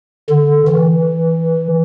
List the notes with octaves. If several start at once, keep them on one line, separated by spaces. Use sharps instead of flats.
D3
E3